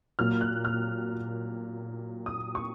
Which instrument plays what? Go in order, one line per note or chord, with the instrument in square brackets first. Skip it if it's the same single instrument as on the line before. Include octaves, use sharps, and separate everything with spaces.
[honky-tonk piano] A#2 F#3 A#3 F6
F#6
F6
D#6
C#6